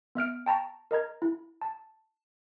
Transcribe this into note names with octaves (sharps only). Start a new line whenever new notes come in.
B3 E5 F6 D7
G5 A5 A#5 C#6
A#4 D#5 A#5 G#6
E4
A5